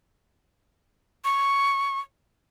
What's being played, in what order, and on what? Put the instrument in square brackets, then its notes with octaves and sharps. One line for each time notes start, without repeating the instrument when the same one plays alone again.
[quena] C#6